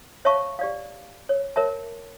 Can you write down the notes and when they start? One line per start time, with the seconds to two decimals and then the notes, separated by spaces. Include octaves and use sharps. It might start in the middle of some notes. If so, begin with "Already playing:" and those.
0.25 C#5 E5 F5 A5 C#6
0.59 G4 D5 F5
1.29 C#5
1.56 A#4 C#5 E5 A5